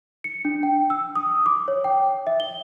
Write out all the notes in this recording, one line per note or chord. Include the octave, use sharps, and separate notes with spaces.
C#7
D4
G5
E6
D#6
D6
C#5
G5
E5
G7